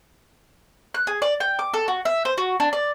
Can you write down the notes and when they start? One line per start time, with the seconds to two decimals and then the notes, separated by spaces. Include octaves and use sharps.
0.94 F#6
1.07 G#4
1.22 D5
1.40 G5
1.59 D6
1.74 A4
1.88 F#4
2.05 E5
2.25 C5
2.38 F#4
2.60 D4
2.73 D5